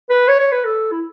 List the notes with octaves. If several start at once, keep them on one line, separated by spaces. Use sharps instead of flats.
B4
C#5
C#5
B4
A4
E4